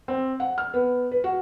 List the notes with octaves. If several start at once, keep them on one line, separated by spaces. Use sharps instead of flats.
C4
F#5
F6
B3
B4
F#4